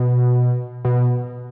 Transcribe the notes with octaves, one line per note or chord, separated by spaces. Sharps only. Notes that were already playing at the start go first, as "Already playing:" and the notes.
Already playing: B2
B2